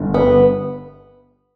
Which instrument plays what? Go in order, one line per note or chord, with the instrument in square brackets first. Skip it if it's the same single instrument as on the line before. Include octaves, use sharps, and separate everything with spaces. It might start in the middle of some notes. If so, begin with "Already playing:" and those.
Already playing: [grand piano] G1 G2 D3
[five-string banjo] B3